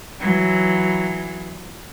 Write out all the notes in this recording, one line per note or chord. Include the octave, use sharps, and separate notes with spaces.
E3 F#3